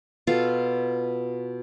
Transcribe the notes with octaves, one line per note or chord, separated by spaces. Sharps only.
B2 F4 A4 F5